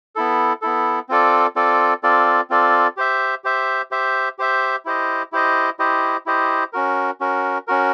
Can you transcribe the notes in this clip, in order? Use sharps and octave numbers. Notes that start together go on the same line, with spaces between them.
B3 E4 A4
B3 E4 A4
C4 F4 A4 D5
C4 F4 A4 D5
C4 F4 A4 D5
C4 F4 A4 D5
G4 C5 E5
G4 C5 E5
G4 C5 E5
G4 C5 E5
E4 G4 C5 D#5
E4 G4 C5 D#5
E4 G4 C5 D#5
E4 G4 C5 D#5
C#4 F#4 A#4
C#4 F#4 A#4
C#4 F#4 A#4